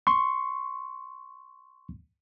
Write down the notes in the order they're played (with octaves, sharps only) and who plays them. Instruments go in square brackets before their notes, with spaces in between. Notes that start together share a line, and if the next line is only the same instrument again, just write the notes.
[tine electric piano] C6 C#6